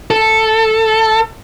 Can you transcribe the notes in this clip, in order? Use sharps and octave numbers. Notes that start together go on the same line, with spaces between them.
A4